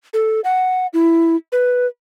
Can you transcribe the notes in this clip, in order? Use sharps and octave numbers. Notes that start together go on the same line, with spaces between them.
A4
F#5
E4
B4